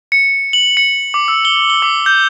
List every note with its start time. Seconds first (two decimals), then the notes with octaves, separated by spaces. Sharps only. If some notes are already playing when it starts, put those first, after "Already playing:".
0.12 C#7
0.53 F#7
0.77 C#7
1.14 D6
1.28 E6
1.45 G7
1.70 G7
1.82 D6
2.06 G6